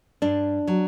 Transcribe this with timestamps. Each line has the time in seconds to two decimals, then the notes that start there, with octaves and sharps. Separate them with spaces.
0.22 G2 D4
0.67 F#3